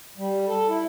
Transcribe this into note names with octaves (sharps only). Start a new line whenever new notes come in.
G3
A4
E4